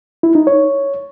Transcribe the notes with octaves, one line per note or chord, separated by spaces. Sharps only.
E4
D#4
C#5